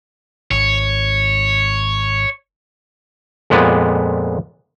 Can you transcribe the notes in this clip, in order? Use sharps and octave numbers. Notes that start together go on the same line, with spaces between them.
G#1 C#5
F2 A#2 G#3 B3 D5